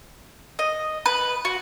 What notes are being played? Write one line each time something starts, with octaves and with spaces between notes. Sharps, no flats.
D#5
B4
F#4